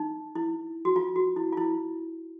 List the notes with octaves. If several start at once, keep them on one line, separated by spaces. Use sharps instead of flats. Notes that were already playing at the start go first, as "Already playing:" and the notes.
Already playing: D#4
E4
F#4
F4
F#4
E4
F4
E4